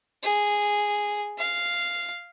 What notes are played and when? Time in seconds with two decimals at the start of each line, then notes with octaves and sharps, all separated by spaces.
0.23 G#4
1.38 F5